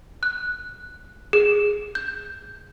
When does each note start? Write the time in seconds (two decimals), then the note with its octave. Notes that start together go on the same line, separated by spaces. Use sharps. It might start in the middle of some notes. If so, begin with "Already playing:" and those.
0.23 F#6
1.33 G#4
1.95 G6